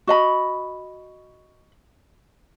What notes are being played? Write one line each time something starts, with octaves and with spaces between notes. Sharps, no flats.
F#4 D#5 B5